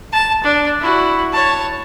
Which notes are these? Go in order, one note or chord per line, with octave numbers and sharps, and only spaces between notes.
A5
D4
E4 F#4
C#5 A5